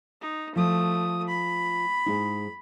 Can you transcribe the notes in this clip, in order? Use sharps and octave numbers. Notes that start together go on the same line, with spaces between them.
D#4
F3 A3 D#6
B5
G#2 G#3 D#4